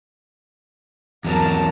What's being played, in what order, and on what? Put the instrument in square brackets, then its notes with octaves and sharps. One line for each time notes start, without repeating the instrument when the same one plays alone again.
[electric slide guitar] E2 F#3 [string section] A#4 A5 A#5